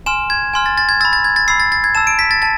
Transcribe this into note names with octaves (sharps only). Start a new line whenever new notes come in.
G#5 C6 F6 E7
G#6
G#5 C6 F6
A6
A6
G#6
B5 E6 A6
A6
G#6
A6
B5 E6 C7
A6
A6
G#6
A5 E6 E7
D7
B6
A6
A5 A6